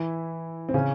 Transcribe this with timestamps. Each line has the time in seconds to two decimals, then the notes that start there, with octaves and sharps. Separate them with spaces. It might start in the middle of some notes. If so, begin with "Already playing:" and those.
Already playing: E3 E4
0.69 C4
0.74 C#3 C#4